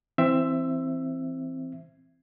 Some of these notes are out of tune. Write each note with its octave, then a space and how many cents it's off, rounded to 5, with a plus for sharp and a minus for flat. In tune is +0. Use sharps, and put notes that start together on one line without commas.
E3 +0 C4 +0 E5 +15